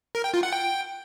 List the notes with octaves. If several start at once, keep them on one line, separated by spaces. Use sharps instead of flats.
A#4
G5
F4
F#5
G5